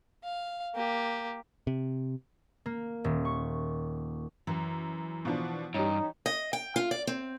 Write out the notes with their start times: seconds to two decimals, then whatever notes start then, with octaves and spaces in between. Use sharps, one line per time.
0.24 F5
0.74 A#3 G4
1.67 C3
2.66 A#3
3.04 D#1
3.25 C#6
4.47 F#2 E3
5.25 B2 F3 D4
5.74 G2 G3 C#4 D#4
6.26 D#5
6.53 G5
6.76 F4
6.91 D5
7.07 C4